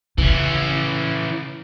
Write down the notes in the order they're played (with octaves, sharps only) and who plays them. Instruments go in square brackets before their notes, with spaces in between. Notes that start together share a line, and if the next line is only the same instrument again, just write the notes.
[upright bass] C#3 [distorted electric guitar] E3 C#4